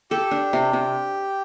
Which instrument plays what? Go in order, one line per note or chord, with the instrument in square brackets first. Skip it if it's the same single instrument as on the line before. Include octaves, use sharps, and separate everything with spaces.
[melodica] G4 [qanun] A4
[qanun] D4
C3
C3